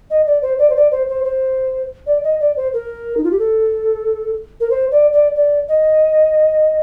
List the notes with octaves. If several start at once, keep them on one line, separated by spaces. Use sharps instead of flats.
D#5
D5
C5
D5
C5
D5
C5
C5
C5
D5
D#5
D5
C5
A#4
D#4
F4
G4
A4
A#4
C5
D5
D5
D5
D#5